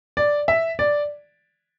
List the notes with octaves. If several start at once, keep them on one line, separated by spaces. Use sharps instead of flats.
D5
E5
D5